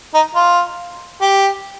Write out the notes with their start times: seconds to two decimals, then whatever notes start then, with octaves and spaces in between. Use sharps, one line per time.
0.14 D#4
0.35 F4
1.22 G4